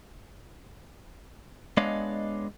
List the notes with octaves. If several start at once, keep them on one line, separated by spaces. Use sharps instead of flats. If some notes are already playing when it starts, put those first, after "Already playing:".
G#3 B3 D4 C#5 D#5 F5